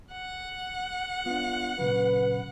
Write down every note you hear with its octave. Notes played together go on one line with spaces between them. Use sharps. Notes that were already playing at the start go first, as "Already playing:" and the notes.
F#5
B3 D4 F4
A#2 C#3 F#3 B4